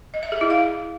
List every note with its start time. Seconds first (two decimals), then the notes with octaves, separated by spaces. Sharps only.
0.14 D#5
0.23 E5
0.32 G#4
0.41 E4
0.50 F5